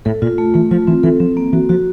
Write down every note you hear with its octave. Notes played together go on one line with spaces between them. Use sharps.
A2 A4
A#2 F4
A3
E3 A3
F3 F4
E3 C4
E3 A4
F3 C4
A#3
E3 F#4
F3 F#4